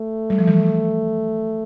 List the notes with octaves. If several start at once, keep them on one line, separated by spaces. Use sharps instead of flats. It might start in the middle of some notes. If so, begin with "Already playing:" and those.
Already playing: A3
G3
F3
E3 G3